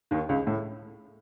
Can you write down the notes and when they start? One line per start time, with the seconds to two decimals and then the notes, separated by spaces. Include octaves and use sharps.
0.11 D#2 D#3
0.29 C#2 C#3
0.47 A2